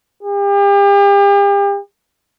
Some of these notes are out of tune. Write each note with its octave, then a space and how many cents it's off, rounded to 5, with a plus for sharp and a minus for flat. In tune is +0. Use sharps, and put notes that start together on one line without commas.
G4 +40